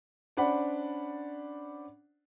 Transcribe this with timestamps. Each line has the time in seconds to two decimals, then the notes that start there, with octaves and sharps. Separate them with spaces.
0.37 C#4 D4 C5 D5 F#5 B5